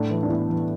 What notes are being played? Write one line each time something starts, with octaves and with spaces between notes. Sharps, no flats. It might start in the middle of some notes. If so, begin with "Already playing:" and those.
Already playing: A2 A3 D4
E3
D4
E3 B3 E4
E3